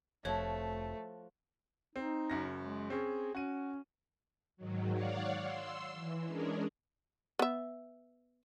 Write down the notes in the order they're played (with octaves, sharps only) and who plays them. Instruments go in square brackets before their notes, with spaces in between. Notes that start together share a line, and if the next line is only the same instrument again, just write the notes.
[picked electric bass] F1 [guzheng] F3 F#4 [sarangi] A3 [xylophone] C#5
[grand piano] C4 [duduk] D#4
[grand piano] F#1 F#2 A#6
[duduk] G#3
[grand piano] C4 C#4 [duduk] G#4
[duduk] C#4 [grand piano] F#4 D#7
[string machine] G#2 D#3 F#3
C#5 D5 F5 F#5
C6 E6
E3
G#3 C#4 D4 G#4 A#4
[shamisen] B3 E5